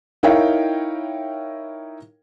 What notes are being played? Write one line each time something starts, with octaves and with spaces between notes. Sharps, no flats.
D#4 E4 A#4 C#5 F5 G5